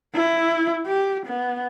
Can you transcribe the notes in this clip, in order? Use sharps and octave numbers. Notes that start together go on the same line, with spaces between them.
E4
G4
B3